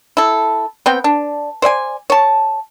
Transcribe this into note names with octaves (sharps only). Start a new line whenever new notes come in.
E4 A4
B3 C4 G5
D4
C5 D5 E5 G#5
C#5 A5